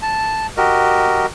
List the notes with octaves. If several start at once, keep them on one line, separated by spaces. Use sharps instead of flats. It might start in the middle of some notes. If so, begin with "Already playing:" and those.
A5
F#4 G4 A#4 D#5